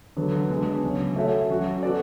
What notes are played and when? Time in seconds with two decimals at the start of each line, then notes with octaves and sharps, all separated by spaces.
0.16 D3 F#3 B3
0.50 B2 G#3 B3 D4
0.83 C#3 F#3 C#4
1.16 A3 C#4 F#4 C#5 E5
1.50 F#3 C#4 F#4
1.83 B3 F#4 A4 D5